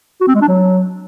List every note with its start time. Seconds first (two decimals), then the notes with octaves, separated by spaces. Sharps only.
0.21 F#4
0.28 C4
0.35 G#3
0.42 D4
0.48 F#3